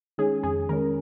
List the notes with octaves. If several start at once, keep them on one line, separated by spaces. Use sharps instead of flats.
D#3 G#3 C#4 G#4
F2 G#4
D#3 G#3 C#4 A#4